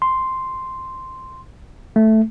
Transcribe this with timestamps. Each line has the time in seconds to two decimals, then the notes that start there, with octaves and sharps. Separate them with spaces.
0.02 C6
1.96 A3